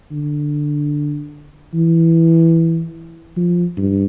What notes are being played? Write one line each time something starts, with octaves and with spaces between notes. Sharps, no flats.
D3
E3
F3
G2